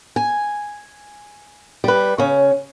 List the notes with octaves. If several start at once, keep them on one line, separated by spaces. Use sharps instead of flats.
G#5
G3 B4
C#3 C#4